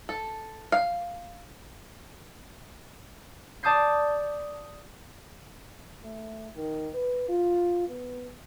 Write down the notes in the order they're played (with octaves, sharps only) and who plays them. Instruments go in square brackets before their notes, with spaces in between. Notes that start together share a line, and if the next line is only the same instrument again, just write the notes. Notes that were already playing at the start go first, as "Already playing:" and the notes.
[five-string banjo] A4
F5
[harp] D5 A5 D6 D#6 G6 C7
[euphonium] A3
D#3
B4
F4
B3